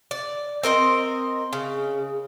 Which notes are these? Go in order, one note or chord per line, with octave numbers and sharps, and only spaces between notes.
D5
C4 A#4 D#5 A#5
C#3